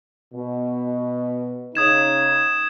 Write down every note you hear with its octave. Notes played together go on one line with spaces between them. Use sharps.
B2
C#3 D#4 D#6 G#6 E7